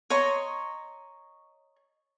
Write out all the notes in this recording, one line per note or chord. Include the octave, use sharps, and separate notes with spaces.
C#5 D#5 A#5 C6